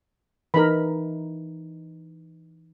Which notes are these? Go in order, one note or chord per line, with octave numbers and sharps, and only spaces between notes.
E3 D#4 A#4 B5